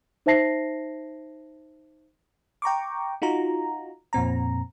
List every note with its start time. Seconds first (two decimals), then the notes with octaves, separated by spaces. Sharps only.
0.26 D#4 C5 E5 A5 A#6 C7
2.62 G5 A#5 C#6 D6
3.22 D#4 F4 F#4 A#5
4.13 F2 A#2 C4 A#5